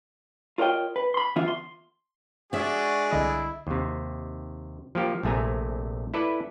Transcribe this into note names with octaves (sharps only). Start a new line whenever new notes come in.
F4 A#4 C#5 D#5 G5
B4
B5 C6
D3 E3 B3 F4 E5
C6
G#3 D4 F#4 G#4 D5 E5
C2 D3 E4 D#5
D#2 C3
F3 A#3 G4
A#1 C3 A3 G#5 A#5
E4 A4 B4 D5